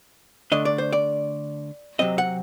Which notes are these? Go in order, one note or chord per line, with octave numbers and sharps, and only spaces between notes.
D3 A3 D4 D#5
D5
C5
D5
C3 F#3 C4 D#5
F#5